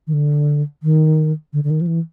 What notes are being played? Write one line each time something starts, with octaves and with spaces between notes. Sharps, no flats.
D#3
D3
D#3
D3
D3
D#3
F3
E3